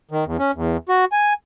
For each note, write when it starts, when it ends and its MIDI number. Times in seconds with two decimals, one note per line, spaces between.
0.11 0.24 51
0.26 0.37 40
0.39 0.51 61
0.55 0.77 40
0.89 1.05 66
1.12 1.33 80